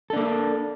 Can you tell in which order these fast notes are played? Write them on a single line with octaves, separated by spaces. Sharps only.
A4 D4 A#3